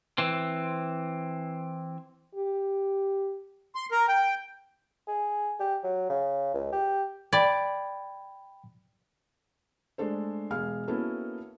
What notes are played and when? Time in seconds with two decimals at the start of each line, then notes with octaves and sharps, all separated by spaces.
0.18 E3 C4
2.35 G4
3.75 C6
3.92 A#4
4.09 G5
5.08 G#4
5.60 G4
5.84 F#3
6.09 C#3
6.54 C#2
6.72 G4
7.33 D5 G5 B5 G#6
9.98 G#3 A3 D4 A4 C5
10.50 E1 G#4 F5 F6
10.88 A#3 B3 C#4 E4 F#4 A4